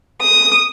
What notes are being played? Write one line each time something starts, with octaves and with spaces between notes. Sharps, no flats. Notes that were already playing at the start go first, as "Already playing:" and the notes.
D#6